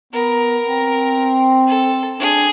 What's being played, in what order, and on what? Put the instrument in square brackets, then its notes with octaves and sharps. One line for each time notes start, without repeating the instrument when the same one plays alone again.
[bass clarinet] B3 [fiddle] A#4
[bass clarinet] C4
[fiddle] A4
[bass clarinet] D4 [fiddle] G#4